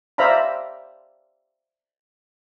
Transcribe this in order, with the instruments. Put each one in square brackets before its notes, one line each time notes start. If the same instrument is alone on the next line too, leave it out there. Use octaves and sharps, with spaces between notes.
[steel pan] C5 D5 E5 F5 A#5 B5